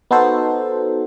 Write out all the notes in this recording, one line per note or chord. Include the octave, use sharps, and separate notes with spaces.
B3 D#4 F#4 A4 C5